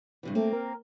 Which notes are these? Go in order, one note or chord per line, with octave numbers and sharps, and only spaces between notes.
G2 C3 E3
A3 A#3 C4
A#4